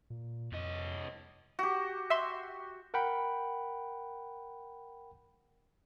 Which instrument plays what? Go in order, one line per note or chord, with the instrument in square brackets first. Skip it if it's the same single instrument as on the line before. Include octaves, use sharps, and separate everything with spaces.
[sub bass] A#2
[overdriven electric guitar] C2 D#5 [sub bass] F2
[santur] F#4 G4
[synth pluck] E5 C6
[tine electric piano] A#4 F#5 G5 B5